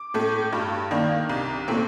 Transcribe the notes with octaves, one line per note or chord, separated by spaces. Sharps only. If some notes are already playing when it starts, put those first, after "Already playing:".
Already playing: D6
A2 A3
G2
D#3 A#3 D4
C2
A#2 A3 C4